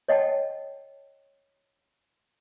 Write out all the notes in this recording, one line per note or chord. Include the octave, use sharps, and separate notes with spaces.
C#5 D#5 F#5 G5 A5